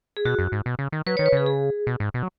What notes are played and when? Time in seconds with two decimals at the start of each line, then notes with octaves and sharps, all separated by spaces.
0.17 G#4
0.25 B2 F#4
0.39 F#2
0.52 G#2
0.66 B2
0.79 C#3
0.92 D#3
1.06 F#3 B4
1.17 D#3 C#5
1.26 B4
1.32 C#3 G#4
1.46 G#4
1.87 B2
2.00 G#2
2.14 B2
2.23 F#3